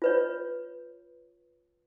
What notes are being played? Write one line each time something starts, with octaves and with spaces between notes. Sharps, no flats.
F4 B4 C#5